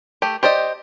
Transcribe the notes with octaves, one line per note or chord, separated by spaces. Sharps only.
A3 G4
G4 C5 D5 D#5